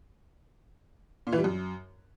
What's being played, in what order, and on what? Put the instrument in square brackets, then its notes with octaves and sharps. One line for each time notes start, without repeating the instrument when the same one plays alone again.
[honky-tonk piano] A#2
E3
G3
F#2